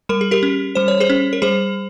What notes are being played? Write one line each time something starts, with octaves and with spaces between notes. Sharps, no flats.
G3 A#4
G#4
G4 A#4
C#4
G3 C5
C#5
G#4 C5
C#4
A#4
G3 G#4 C5